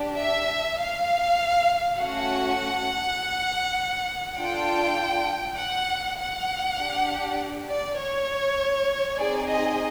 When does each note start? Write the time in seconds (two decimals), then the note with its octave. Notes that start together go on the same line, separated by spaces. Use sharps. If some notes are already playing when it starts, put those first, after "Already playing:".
Already playing: D4 G4
0.20 E5
0.80 F5
1.99 A3 C#4 F#4 F#5
4.39 D4 F4 A4 G5
5.59 F#5
6.19 F#5
6.79 D4 G4
7.69 D5
7.99 C#5
9.18 C4 D#4 G#4 D5
9.49 D#5